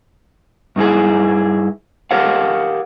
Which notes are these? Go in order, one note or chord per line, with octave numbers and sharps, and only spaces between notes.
G2 D#4 E4 G#4
G4 A#4 C#5 F5 F#5